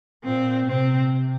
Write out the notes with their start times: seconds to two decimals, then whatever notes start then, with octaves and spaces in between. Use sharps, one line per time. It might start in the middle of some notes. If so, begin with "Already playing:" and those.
0.24 A#2 C4
0.67 C3 C4